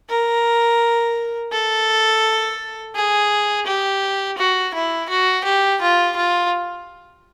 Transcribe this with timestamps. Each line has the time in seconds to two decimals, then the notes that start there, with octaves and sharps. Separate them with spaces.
0.09 A#4
1.52 A4
2.95 G#4
3.66 G4
4.38 F#4
4.74 E4
5.09 F#4
5.45 G4
5.81 F4
6.16 F4